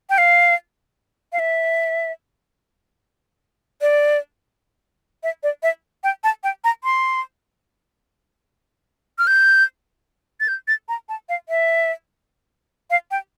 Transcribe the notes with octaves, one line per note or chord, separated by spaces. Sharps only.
G5
F5
F5
E5
D5
E5
D5
E5
G5
A5
G5
A#5
C6
F6
G6
A6
G6
A6
A#5
A5
F5
E5
F5
G5